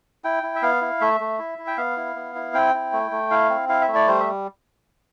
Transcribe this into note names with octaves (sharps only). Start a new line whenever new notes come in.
E4 G5
E4
E5
B3 F5
E4
A3 E5
A3
E4
E4
G5
B3 F5
E4
B3
E4
C4 G5
E4
A3
A3
E4 F5
C4
E4 F5
E5
A3
D5
G3 C5
E5